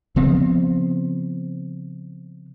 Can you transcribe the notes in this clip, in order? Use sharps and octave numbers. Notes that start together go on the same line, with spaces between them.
C#3 F3 B3 C4